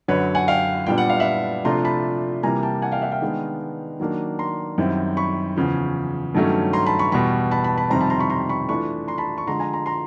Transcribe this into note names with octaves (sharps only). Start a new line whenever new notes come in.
F#2 D3 F#3 B4 C#5
F#5 G#5
F5 G5
A#2 G3 B3 D4 G5
F#5
F5
E5 F#5
C3 F3 A3 D4 F4 A#5 C6
A5 B5
C3 E3 G3 A#3 G#5 A#5
G5 A5
F#5 G#5
F5 G5
E5 F#5
F5 G5
D#3 G#3 B3 D4
D#3 F#3 A#3 D4
A#5 C6
F#2 D#3 G3 C4 E4
B5 C#6
E2 C#3 F3
G2 D#3 F#3 A3 C#4
A#5 C6
A5 B5
B5 C#6
E2 B2 G3 B5 C#6
A5 B5
A5 B5
A5 B5
F2 C3 D#3 G3 C4 A#5 C6
A5 B5
A#5 C6
B5 C#6
A#5 C6
B5 C#6
E3 A3 D4 F4 B5 C#6
A#5 C6
A5 B5
B5 C#6
D3 F3 G#3 A#5 C6
G#5 A#5
A#5 C6
A#5 C6